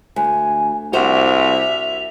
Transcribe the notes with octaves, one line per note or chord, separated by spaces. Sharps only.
D2 G#5
C2 F#4 C5 E5 F7